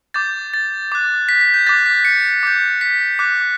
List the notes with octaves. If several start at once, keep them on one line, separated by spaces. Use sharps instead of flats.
D6 G6 A6
A6
D6 F#6
B6
B6
G6
D6 F#6 A6
B6
C#7
D6 G6
B6
D6 F#6